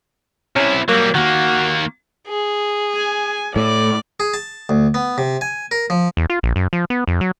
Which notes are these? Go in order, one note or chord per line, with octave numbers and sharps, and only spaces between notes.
C3 C#4 E4
F#3 G3 A#3
D#3 A#3 F#4
G#4
G#5
A2 D5
G#4
A5
D2
B3
C3
G#5
A#4
F3
E2
F4
A#1
F#2
F3
B3
F2
F#3